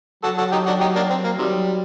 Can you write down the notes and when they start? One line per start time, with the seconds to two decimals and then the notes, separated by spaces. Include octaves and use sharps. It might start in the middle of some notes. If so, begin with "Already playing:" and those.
0.23 F#3 F#4 A4
0.38 F#4 A4
0.52 D#4 G4
0.67 D4 F#4
0.81 D#4 G4
0.95 A#3 D4
1.10 C4
1.24 A#3
1.39 C3 D#3 F#3 G3